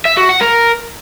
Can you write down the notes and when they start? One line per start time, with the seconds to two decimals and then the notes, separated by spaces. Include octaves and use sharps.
0.05 E5
0.17 F#4
0.29 F#5
0.41 A#4